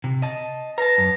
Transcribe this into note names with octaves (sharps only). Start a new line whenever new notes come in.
C3
D#5 A5
B4 A5 A#5 A#6
F#2